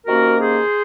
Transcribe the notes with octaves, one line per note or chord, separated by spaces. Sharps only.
C3 D#3 A#3 C#4 F#4 A#4
G#4 C5